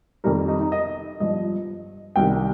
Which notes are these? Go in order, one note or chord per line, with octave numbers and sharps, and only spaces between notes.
F2 D#3 G3 A#4
D#4
D#4
D#5
G2 F3 D#5
C2 C3 D#3 G3 G5